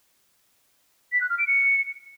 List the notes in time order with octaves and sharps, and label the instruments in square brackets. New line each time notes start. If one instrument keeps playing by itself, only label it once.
[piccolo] B6
F#6
F6
D7
C#7